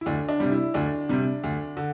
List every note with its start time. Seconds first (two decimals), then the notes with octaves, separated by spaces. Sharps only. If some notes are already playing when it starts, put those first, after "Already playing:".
0.01 E4
0.06 D2 D4
0.29 D4
0.40 C3 G3
0.52 E4
0.74 D2 D4
1.09 C3 G3
1.44 D2
1.77 D3